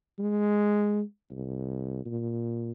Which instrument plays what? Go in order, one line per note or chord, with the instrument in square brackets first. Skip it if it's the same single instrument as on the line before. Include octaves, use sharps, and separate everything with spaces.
[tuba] G#3
C2
A#2